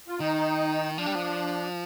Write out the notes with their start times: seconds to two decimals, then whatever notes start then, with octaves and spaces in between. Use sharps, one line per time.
0.08 F4
0.20 D#3 D#4
0.98 F3 D4
1.06 G3
1.15 F3